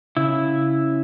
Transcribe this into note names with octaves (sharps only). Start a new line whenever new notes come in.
C#3 E4